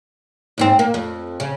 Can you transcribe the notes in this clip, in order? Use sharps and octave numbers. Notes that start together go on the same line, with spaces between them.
D#2 G#2 C4
A#3
F2
C#3